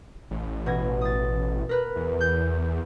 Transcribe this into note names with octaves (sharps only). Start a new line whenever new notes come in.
A1
B2 G#6 A#6
D#6 A6
A#4 B4 F#6
E2
G6